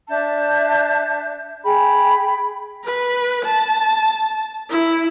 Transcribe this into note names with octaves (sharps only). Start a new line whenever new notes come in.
D4 E5 A5 G6
G#4 G5 B5
B4
A5
E4